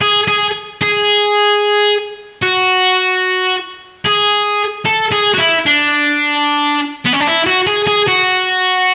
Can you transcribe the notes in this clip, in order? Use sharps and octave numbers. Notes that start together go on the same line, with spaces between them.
G#4
G#4
G#4
F#4
G#4
A4
G#4
F#4
E4
D4
B3
C#4
D4
E4
F#4
G#4
G#4
F#4